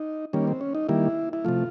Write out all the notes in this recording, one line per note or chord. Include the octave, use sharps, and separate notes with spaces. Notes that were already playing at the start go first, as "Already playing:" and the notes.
Already playing: D#4
D#3 G3 A#3 C#4
C4
C#4
D#4
D#3 G3 A#3 E4
E4
C3 F3 A3 F4